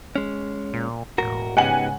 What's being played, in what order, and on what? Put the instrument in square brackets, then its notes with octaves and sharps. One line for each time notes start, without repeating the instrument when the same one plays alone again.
[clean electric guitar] G#3 C#4
[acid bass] A#2
[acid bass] E1 [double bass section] A2 [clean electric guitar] F#4 A#4
[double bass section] G#2 C#3 [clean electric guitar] B3 D#4 G4 [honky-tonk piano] F#5 G#5 F#7